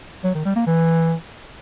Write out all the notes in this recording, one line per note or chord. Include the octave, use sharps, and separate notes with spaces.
F#3
D#3
G3
A#3
E3